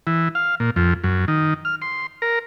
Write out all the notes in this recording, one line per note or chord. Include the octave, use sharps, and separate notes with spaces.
E3
F5
A#2
F2
F#2
D#3
F6
C6
A#4